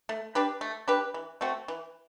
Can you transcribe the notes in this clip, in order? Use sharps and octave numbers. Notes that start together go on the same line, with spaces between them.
A3
D4 G4 B4
A3
D4 G4 B4
E3
A3 C4 F#4
E3